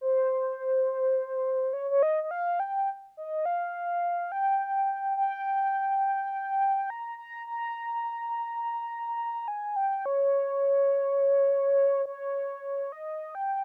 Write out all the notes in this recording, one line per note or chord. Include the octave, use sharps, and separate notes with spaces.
C5
C#5
C#5
D#5
D#5
F5
G5
D#5
F5
G5
G5
A#5
A#5
A#5
G#5
G5
C#5
C#5
D#5
G5